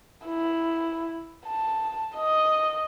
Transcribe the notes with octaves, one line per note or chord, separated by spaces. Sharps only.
E4
A5
D#5